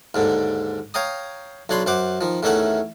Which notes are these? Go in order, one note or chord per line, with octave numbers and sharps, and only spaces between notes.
D#2 G#2 D3
C#5 F5 G5 A#5 D#6
B1 D4 C#5 B5 C6
F#2 C5 F#5 D6
D#3 F3
E2 D#3 A3 C#4 E5 F#5